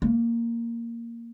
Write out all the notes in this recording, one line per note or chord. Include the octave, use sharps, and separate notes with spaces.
A#3